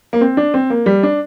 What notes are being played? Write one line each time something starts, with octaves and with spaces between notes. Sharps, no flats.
A#3
C4
D4
C4
A#3
G3
D4